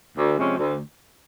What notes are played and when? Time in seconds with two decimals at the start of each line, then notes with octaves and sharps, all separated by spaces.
0.17 D2
0.38 C3 F3 G#3 C#4
0.58 D2